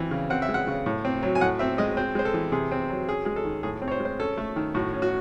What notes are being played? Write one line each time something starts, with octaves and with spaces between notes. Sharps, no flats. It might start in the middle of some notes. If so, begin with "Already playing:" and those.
Already playing: E3 C4
C#3
C4 F#5
E5
G#3
F#5
C#3
A2
C4
F#3
G#5
A2 F#5
C4 E5
G#3 D#5
C4 C5
G#3 C5
A4
E3
C3 G#4
C4
F#3
C#4 G#4
G#3 G#4
A4
D#3
A2 G#4
C4
C#5
C5
G#3
C5
C#4 A4
A3
D#3
A2 F#4
C#4
F#4